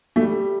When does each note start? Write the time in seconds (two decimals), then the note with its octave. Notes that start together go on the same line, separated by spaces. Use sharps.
0.16 A3
0.21 G3